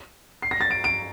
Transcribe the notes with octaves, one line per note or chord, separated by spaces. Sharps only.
C7
A#6
A6
D7
D7